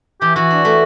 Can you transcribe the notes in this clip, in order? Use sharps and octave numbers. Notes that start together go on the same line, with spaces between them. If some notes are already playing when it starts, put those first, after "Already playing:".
E3 G4
E3 F#4
D4
A3